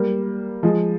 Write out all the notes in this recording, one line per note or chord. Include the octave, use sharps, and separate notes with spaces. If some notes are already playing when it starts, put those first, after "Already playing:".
Already playing: G3 A#3
F3 G#3